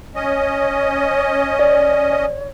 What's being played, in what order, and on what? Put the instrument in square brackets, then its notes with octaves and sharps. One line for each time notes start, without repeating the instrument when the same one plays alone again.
[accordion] C#4 D#5 [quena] C#5
[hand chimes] D5